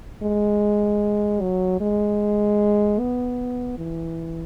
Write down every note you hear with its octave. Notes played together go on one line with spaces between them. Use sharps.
G#3
F#3
G#3
B3
E3